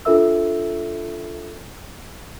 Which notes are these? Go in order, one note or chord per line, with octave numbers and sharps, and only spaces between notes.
D4 F4 A4 A#4 E5 E6